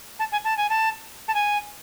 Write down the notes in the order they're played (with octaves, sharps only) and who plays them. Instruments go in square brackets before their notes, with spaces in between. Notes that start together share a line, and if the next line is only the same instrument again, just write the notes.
[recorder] A5
G#5
A5
G#5
A5
A5
G#5